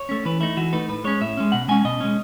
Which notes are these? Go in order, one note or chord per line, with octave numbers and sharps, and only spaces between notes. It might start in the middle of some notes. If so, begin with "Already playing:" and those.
Already playing: C#5
A3 C#4
E3 B4
A3 D#4 E4
E3 F#4
A3 D#4 B4
A2 B4
G#3 C#4 C#5
A2 E5
G#3 C#4
B2 F#5
G#3 C#4 G#5
B2 D#5
G#3 C#4